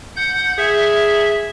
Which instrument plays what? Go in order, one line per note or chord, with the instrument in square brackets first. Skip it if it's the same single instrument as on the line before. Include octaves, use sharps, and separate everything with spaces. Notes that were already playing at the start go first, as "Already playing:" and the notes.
[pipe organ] F#5 G6
[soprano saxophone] G#4 [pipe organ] E5